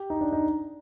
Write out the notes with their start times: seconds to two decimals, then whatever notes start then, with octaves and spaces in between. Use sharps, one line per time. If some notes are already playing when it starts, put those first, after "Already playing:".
Already playing: G4
0.10 D#4
0.21 D4
0.32 D#4